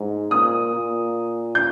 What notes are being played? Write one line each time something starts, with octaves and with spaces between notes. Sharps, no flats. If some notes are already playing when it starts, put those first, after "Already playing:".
Already playing: G#2
A#2 D#6
A#2
G6